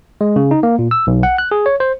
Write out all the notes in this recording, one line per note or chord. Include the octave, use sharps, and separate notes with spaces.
G#3
C#3
D#4
A#3
A#2
E6
B1
F#5
F#6
G#4
C#5
C5